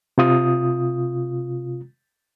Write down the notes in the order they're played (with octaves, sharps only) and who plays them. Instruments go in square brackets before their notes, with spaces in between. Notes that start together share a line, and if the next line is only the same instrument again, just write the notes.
[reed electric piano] C3 F4 D#6